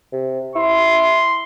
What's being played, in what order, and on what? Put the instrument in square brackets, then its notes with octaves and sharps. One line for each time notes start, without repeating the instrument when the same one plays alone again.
[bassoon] C3
[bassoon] E4 [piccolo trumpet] C6